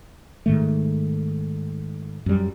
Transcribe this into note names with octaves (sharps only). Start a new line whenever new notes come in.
G#2 D#3 A3
F#2 G3